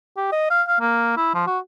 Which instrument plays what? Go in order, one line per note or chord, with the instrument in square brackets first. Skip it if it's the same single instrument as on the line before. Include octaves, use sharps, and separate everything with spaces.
[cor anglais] G4
D#5
F5
F5
A#3
E4
F3
F#4